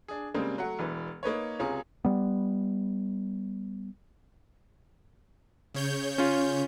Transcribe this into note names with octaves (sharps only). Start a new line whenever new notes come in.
D4 G#4
C#3 G3 G#3 A#3 C4
F#3 A3 F#5
E1 E3 B4
A#3 D#4 B4 C#5
C#2 C3 C#4 F4 G#4 A#5
G3 B3
C#3 C#5 G6
C#4 F4